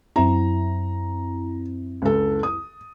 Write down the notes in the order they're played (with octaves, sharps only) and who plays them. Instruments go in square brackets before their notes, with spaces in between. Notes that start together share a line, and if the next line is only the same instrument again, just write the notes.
[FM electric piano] F#2 C4 E4 [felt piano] A#5
[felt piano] C#2 A4
D#6